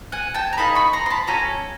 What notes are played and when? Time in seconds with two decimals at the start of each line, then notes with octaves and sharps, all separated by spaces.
0.12 F#5 G#5
0.34 G5 A5
0.53 A#5
0.58 A#3 D#4 G#4 A5 B5
0.75 B5 C#6
0.93 A#5 C6
1.06 C6
1.10 A5 B5
1.27 C#4 F#4 A4 G#5 A#5